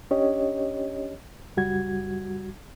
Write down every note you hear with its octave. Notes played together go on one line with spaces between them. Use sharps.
C#4 D4 G4 C#5 D#5
C#2 F#2 G3 F#4 G#6